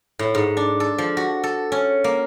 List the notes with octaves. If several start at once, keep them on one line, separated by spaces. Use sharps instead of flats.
A2
G#2
D4
A4
F3
F#4
A4
C#4
A#3